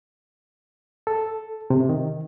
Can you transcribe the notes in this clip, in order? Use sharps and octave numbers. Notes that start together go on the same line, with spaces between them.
A4
C3
D#3